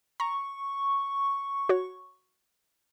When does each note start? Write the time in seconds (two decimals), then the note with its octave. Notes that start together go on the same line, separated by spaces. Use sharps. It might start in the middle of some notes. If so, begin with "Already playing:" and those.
0.20 A#5 C#6
1.69 F#4 C#5